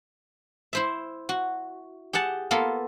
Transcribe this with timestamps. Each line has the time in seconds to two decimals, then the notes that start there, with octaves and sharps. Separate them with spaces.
0.73 E4 C5 E5
1.29 F#4
2.13 G4 G#4 F#5 A5
2.51 A#3 B3 F4 A4